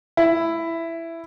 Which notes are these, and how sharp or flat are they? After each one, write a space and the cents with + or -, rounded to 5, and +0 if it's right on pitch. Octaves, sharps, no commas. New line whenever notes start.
E4 +10